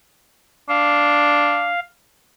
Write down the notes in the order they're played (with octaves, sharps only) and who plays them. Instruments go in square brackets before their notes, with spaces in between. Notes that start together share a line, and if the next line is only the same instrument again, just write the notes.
[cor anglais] D4 [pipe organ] F5